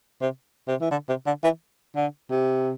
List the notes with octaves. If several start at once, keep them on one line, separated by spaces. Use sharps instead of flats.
C3
C3
E3
D3
C3
D3
E3
D3
C3